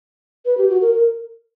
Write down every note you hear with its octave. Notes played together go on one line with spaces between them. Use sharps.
B4
G4
F#4
A#4
A#4